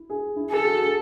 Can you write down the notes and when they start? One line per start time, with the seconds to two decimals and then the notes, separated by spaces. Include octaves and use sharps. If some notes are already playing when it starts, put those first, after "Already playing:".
Already playing: E4
0.10 G#4
0.36 E4
0.51 G#4 A4
0.64 F#4
0.82 G#4